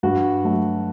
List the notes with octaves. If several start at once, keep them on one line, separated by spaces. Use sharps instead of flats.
G2 F#4
F#3 A3